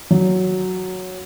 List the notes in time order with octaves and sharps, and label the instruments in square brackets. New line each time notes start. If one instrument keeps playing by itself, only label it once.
[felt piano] F#3